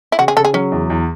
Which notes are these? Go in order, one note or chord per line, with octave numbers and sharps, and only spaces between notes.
E4
C#3 F#4
G#4
C#3 A4
G#4
F#3 C#4
E2
E2